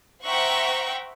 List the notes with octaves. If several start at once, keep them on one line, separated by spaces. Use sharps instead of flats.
C5 E5 F#5 G5 A#5 C#6